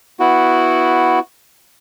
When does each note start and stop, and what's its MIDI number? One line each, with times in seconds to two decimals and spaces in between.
0.20 1.19 59
0.20 1.19 64
0.20 1.19 66